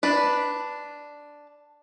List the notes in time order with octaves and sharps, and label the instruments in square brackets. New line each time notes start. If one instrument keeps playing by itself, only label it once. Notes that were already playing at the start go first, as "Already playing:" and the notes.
[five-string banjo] D4 B4